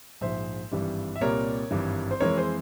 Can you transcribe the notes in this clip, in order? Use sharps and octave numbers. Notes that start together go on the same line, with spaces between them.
A#1 G#2 F3 C5 E5
G#1 G2 E3 G3
E5
C2 A#2 G3 A#4 C#5
G#1 G2 E3
C5
F2 E3 G#3 A#4 C#5
G#4 C5